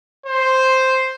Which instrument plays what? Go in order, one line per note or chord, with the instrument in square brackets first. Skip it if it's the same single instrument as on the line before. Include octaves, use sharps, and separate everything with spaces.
[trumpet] C5